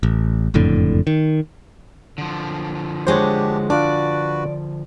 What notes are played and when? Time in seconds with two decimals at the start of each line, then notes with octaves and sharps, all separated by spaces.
0.03 A1
0.54 F#1 F2 A2 D3
1.07 D#3
2.18 D3 F3
3.07 G#3 D4 F#4 G4 C5 C#5
3.70 D4 F4 F#4 B4 D5